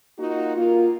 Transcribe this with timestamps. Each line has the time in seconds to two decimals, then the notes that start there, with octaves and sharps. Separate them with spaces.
0.18 A#3 D#4 F4 F#4
0.56 A#3 F4